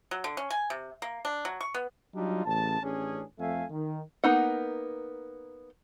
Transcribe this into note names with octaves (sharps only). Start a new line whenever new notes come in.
F#3
D3
C#4
G#5
C3
A#3
D4
F#3
C#6
B3
F#3 G3 D4 D#4 F4
A1 C#3 A5
A1 C#4 D4 G#4
F2 A3 E5 F5 G#5
D#3
A#3 B3 D#4 F#5